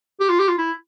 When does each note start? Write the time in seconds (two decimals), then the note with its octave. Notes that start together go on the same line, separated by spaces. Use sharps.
0.20 G4
0.30 F4
0.40 G4
0.49 F4
0.58 E4